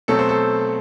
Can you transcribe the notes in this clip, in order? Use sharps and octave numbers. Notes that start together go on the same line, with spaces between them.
B2 F#3 A3 C4 A4
C5
A4